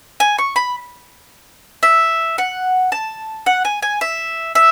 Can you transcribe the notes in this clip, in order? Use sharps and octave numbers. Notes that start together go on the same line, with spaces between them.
G#5
C#6
B5
E5
F#5
A5
F#5
G#5
G#5
E5
E5